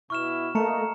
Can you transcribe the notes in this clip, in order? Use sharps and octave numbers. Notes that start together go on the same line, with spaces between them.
B2 E4 C#6 F6 E7
A3 A#3 A#4 D#5 A5 A#5 C#7